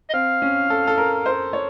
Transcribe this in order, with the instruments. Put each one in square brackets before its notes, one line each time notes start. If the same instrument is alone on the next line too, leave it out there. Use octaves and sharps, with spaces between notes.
[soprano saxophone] D#5
[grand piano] C4 [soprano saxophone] F5
[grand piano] C#4
A4
A4
A#4
C5
C#5